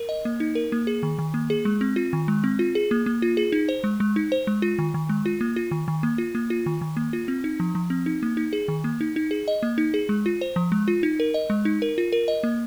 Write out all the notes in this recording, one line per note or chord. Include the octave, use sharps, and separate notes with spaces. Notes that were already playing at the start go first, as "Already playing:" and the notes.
Already playing: A#4
D#5
A#3
D#4
A#4
A#3
G#4
D#3
D#3
A#3
G#4
G#3
C4
F4
D#3
G#3
C4
F4
G#4
A#3
A#3
F4
G#4
D#4
C5
G#3
G#3
D#4
C5
G#3
F4
D#3
D#3
G#3
F4
A#3
F4
D#3
D#3
A#3
F4
A#3
F4
D#3
D#3
A#3
F4
C4
D#4
F3
F3
C4
D#4
A#3
D#4
G#4
D#3
A#3
D#4
D#4
G#4
D#5
A#3
D#4
G#4
G#3
F4
C5
F3
G#3
F4
D#4
A#4
D#5
G#3
D#4
A#4
F4
A#4
D#5
A#3